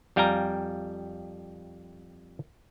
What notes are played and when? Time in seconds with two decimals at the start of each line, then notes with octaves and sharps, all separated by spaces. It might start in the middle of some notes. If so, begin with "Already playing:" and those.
0.16 F2 G3 F5 G5 G#5 A#5